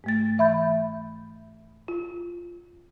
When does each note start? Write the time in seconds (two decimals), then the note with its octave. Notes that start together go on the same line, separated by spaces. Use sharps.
0.04 G#2 A3 A6
0.38 E3 E5 B5 G6
1.88 F4